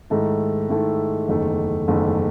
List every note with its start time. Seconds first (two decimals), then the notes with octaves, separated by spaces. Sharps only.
0.10 G#2 D#3 A3 E4 A4
0.69 G#2 D#3 A3 E4 A4
1.28 F#1 E2 D#3 A3
1.88 F#1 E2 D#3 A3